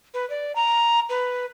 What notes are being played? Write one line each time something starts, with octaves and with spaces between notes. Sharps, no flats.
B4
D5
A#5
B4